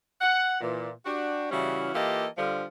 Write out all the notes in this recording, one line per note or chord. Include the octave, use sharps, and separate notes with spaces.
F#5
A#2 E3
D4 F#4 G4
C#3 E3 G3 C#4 E4 F#4
E3 A#3 F4 G4 A4 D#5
D3 F3 G3